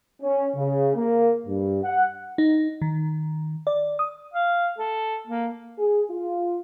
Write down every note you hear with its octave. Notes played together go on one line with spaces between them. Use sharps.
C#4
C#3
A#3
G2
F#5
D#4
D#3
D5
D#6
F5
A4
A#3
G#4
F4